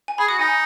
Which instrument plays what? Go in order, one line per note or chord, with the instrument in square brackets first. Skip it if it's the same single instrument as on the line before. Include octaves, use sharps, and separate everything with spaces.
[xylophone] G#5
[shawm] G#4 [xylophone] B5
[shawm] F#4 [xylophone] D#6
[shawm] D#4 [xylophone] G#5